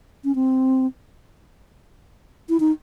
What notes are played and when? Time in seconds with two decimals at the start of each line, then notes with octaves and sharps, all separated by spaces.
0.24 C#4
0.35 C4
2.49 E4
2.60 D#4